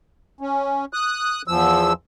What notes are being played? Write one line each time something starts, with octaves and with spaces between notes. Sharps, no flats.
C#4
D#6 F#6
E2 F3 E6